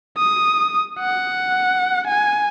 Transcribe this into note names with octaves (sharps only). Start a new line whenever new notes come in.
D#6
F#5
G#5